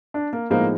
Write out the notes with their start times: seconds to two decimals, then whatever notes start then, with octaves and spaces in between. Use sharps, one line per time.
0.14 D4
0.33 A#3
0.50 A2 F3 G#3 A#3 B3 D#4